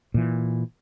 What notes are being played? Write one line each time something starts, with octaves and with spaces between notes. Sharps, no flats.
A#2 E3